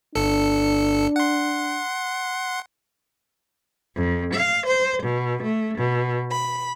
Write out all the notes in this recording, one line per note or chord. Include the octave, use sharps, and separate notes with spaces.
G1 D4 A4 C#7
F#5 C6
F2
F5
C5
B2
A3
B2
B5